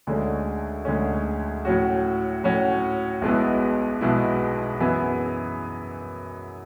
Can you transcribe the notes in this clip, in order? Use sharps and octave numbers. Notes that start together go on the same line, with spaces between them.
D2 D3 G#3 C#4
D2 D3 G#3 C#4
A2 F#3 C#4 F#4
A2 F#3 C#4 F#4
B1 B2 G#3 B3 E4
B1 B2 G#3 B3 E4
F#2 E3 B3 E4 G#4